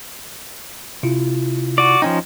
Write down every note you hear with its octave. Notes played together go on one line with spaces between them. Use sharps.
C3 E4 F4
F#4 D5
F3 C#4 D#4 G5